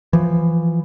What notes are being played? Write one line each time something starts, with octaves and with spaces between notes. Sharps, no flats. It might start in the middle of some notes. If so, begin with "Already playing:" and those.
E3 F3